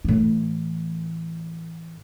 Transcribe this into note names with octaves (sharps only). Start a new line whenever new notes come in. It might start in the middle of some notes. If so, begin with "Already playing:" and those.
A2 E3